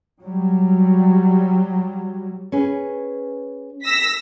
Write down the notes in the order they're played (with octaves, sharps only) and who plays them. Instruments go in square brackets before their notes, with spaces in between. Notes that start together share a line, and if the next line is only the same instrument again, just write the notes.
[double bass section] F#3 G3
[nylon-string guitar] C#4 G#4 B4
[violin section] E6 A#6 B6